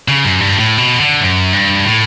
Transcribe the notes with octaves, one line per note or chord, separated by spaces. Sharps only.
C#3
F#2
G2
A2
B2
D3
F#2
G2
A2